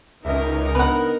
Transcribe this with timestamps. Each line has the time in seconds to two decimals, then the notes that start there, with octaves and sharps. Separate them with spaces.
0.25 C#2 D#4 A#4 D#5 E5
0.75 B3 D4 B4 F#5